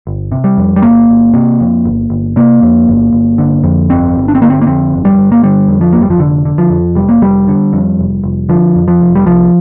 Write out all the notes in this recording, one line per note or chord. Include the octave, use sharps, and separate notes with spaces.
G1
C3
G3
F2
G3
G1 A#3
G1
C3
F2
G1
G1
C3 A#3
F2
G1
G1
D3
F2
G1 C4
G1
D4
C4
D3 A#3
C4
A#3
F2 C4
G1
G3
G1
A#3
D3 G3
F2
F3
G1 A#3
G3
F3
F1 D3
D3
F3
F2
F1 G3
A#3
F1 G3
D3
F2
F1
F1
D3 F3
F2
F3
F1
G3
C2 F3